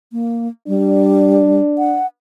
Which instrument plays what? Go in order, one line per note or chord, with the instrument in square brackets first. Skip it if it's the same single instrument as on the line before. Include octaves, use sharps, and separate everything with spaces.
[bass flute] A#3
[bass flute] G3 [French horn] D4
[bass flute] F#5